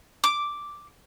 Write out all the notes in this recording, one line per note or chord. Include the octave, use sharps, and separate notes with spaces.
D6